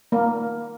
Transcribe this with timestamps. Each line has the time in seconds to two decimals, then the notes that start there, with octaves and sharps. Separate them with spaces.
0.12 A#3